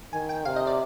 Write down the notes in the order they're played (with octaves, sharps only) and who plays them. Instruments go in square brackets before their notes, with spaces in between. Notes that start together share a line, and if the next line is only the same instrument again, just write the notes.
[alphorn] D#3 [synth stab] G#5
[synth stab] G5
[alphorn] C3 [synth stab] F5
[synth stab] D#5
D5